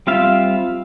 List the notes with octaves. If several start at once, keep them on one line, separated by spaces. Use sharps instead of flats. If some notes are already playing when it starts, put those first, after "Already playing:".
G3 C4 F4 E5 F5